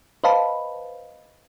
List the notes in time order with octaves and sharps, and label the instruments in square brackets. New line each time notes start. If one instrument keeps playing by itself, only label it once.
[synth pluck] B4 C5 D#5 F5 A5 B5